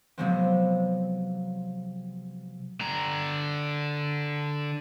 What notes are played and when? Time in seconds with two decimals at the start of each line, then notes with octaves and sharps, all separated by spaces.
0.18 C3 F3 F#3 G#3 B3 C4
2.81 D3 A#5